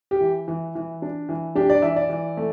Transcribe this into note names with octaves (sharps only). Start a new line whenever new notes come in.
G4
E3
E3
E3
D4
E3
D4 G4
D5
E3 E5
D5
E3
A3